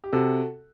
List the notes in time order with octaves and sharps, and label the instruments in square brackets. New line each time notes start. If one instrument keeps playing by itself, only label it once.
[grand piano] G4
[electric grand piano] C3 [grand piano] F#4 A4